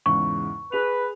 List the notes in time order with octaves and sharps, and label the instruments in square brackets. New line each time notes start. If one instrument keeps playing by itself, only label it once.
[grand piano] E2 G#2 C#3 [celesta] C#6
[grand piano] G#4 F7 [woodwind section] B4